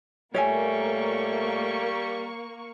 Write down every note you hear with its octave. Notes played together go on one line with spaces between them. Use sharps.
A#2 G3 A3 A#3 C#5 E5 G#5 C#6